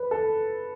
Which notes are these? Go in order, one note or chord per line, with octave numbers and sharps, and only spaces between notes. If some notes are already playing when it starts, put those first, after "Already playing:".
Already playing: B4
A4